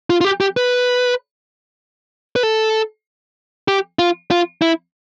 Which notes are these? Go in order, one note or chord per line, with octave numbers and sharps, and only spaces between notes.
F4
F4
G4
G4
B4
B4
A4
G4
F4
F4
E4